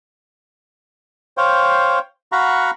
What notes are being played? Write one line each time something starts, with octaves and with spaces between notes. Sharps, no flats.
C5 C#5 F5 G5
F#4 F5 F#5 A#5 B5 C#6